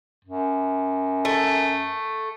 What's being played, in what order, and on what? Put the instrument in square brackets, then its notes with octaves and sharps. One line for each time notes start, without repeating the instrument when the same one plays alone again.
[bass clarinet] F#2
[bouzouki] A3